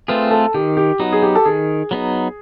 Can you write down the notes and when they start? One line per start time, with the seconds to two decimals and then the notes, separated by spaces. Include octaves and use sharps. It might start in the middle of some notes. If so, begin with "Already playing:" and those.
0.08 A3 C4 F4 G#4 B4
0.31 A4
0.54 D#3 G4
0.77 G4
0.99 F#3 B3 D#4 F#4
1.12 G#4
1.22 G4
1.35 A4
1.45 D#3 G#4
1.91 F#3 B3 D#4